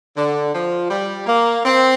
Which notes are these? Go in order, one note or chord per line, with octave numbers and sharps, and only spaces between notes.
D3
F3
G3
A#3
C4